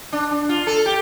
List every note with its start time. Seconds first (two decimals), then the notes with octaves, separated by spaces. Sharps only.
0.13 D4
0.31 D4
0.49 F4
0.67 A4
0.86 G4